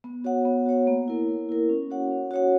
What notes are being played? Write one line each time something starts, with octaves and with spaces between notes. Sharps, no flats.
B3
F#4 C#5 F#5
B3
F#4 C#5 F#5
A#3
E4 A#4
A#3
E4 A#4
C#4
F#4 C#5 F#5
C#4
F#4 C#5 F#5